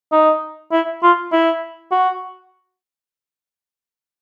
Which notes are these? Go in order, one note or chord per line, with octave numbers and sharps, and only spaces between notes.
D#4
E4
F4
E4
F#4